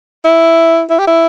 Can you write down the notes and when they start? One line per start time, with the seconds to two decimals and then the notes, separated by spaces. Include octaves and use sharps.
0.25 E4
0.90 E4
0.99 G4
1.07 E4